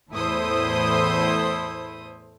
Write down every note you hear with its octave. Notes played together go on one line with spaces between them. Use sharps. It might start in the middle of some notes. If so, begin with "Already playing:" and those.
E2 A2 E4 A4 C5 D#6